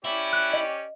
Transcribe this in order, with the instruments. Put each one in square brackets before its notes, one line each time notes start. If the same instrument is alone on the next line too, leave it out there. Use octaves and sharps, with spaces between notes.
[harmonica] C#4 G4 D5 [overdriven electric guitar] E4
[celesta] F#6
D#5